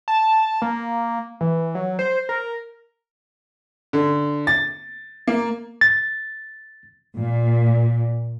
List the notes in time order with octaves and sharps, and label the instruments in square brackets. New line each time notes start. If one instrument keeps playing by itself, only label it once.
[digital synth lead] A5
A#3
E3
F#3
C5
A#4
[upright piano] D3
A6
A#3
[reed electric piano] A6
[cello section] A#2